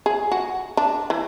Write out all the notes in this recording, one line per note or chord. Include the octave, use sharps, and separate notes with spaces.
G#4
F#4
D4
E3